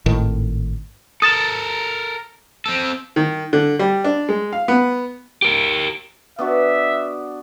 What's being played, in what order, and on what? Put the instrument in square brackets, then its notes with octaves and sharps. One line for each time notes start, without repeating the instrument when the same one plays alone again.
[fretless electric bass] G#1 A2 D#3
[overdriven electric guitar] A4 A#4 [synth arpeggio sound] D#6 A6 E7
[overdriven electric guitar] C4 A4
[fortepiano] D#3
D3
G3
D4
G#3
F5
B3
[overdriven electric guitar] G4 A#4
[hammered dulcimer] B3 D4 F#4 [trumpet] E5